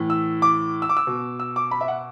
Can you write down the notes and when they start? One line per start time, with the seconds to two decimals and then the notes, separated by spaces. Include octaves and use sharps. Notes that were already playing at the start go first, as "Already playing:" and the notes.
Already playing: A2 E3
0.10 E6
0.42 D6
0.82 E6
0.89 D6
0.97 E6
1.07 B2
1.40 E6
1.56 D6
1.71 B5
1.81 E5
1.88 F#5